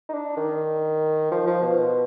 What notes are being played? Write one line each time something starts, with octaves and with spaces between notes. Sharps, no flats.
D#4
D4
D#3
F3
F3
B2